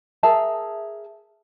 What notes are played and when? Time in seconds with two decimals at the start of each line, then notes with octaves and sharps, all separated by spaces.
0.23 G#4 A#4 E5 A5